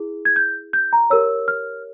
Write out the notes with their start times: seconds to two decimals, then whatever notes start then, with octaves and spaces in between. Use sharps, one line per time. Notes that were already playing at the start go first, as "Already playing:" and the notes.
Already playing: E4 G#4
0.25 G#6
0.36 G6
0.73 G6
0.93 A#5
1.10 G4 A#4 C#5 E6
1.48 F6